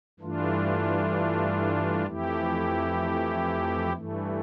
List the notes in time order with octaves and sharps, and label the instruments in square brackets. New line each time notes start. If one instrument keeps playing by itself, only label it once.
[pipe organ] G2 E3 A3 D4 F4
F2 E3 A3 E4 G4
G2 E3 A3